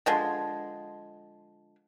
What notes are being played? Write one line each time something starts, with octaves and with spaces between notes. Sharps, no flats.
D3 F3 G#3